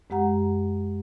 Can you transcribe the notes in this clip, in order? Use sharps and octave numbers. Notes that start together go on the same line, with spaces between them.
F#2 G#3 G4 F#5 A#5